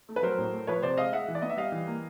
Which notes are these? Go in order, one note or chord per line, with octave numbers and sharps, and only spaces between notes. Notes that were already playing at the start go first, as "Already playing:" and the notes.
A3
B4
F#3 A#4 C5
A2
A3
F3 B4 C#5
C3 C5 D5
G#3 D#5 F5
G#3 E5 F#5
E3
D5
B3 D#5
E5
G3 D#5 F5
E3
A#3